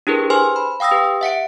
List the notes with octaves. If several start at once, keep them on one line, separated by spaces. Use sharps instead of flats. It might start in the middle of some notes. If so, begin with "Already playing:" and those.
D4 E4 G4 G#4 A#4 B4
B4 C5 G#5 C6 F6
B5
F5 G5 D#6 E6 A#6
G4 B4
E5 F#5 C#7 D7